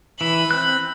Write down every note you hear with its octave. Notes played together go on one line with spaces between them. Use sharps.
E3 B5
C4 F#6